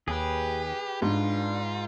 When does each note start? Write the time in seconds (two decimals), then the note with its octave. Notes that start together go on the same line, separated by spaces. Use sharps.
0.08 D#2 G4 G#4 B4
1.02 G#2 D4 F4